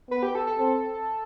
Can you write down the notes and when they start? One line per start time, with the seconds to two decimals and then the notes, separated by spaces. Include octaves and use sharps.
0.10 B3 B4
0.23 G4
0.35 A4
0.47 A4
0.58 C4 A4